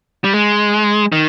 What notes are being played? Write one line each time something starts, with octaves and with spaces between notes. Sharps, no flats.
G3
G#3
D#3